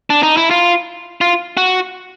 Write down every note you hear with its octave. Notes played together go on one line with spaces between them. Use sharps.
D4
D#4
E4
F4
F4
F#4